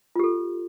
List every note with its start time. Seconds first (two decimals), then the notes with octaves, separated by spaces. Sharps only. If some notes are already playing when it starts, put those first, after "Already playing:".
0.15 F4
0.19 G4
0.23 A4